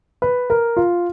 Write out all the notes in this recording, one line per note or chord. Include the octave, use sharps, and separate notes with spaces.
B4
A#4
F4